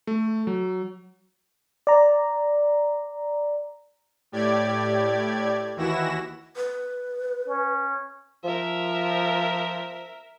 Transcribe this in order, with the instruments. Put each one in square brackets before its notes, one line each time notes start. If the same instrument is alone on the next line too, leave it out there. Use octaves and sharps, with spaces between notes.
[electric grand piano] A3
F#3
[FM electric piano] D5 A#5
[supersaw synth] A2 G4 D5 G#6
D#2 E3 E4 F#4 A#6 E7
[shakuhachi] B4
[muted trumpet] C#4
[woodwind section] F3 [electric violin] A#4 E5